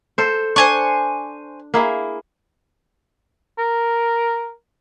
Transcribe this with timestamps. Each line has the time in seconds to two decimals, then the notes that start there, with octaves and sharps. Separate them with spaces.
0.18 A4 C5
0.56 D4 C5 G#5 C#6
1.74 A#3 E4 G#4
3.58 A#4